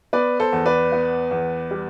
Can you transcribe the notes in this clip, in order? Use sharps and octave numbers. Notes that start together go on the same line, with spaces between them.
B3 B4 D5
A4 C5
E2
B4 D5
B3
E2
G3